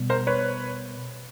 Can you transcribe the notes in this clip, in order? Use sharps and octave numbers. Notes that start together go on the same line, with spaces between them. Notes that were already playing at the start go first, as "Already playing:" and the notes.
Already playing: B2 G3 B3
A#4 C5
B4 C#5